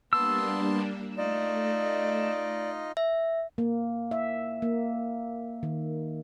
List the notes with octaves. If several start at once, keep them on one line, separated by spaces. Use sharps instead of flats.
G3 A#3 B3 D4 A5 C6 E6
A3 D#4 F4 D5 D#5
E5
A#3
E5
A#3
D#3